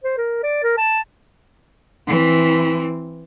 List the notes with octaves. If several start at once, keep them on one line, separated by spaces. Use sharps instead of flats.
C5
A#4
D5
A#4
A5
E3 C4